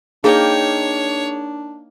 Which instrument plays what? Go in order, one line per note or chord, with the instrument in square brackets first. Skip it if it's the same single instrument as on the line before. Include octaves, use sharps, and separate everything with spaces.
[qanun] A#3 D#4 G5 [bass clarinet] D4 [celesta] G#4 [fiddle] C#5